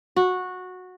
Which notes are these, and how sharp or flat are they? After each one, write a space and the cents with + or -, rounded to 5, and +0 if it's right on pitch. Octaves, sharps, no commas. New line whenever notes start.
F#4 -15